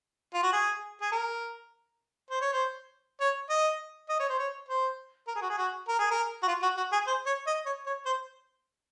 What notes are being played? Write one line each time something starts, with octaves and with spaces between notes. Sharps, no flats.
F4
F#4
G#4
G#4
A#4
C5
C#5
C5
C#5
D#5
D#5
C#5
C5
C#5
C5
A#4
G#4
F#4
G#4
F#4
A#4
G#4
A#4
F#4
F4
F#4
F#4
G#4
C5
C#5
D#5
C#5
C#5
C5